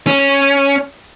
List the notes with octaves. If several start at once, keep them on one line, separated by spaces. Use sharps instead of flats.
C#4